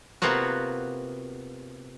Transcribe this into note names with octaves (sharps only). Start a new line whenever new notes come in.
C3 A#3 B3 F4 F#4